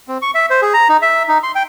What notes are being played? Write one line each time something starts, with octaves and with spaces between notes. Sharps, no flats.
C4
C#6
E5
C5
G#4
A#5
D#4
E5
D#4
C6
G5